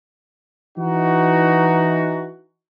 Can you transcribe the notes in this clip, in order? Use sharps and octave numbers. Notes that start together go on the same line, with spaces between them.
E3 D#4 F#4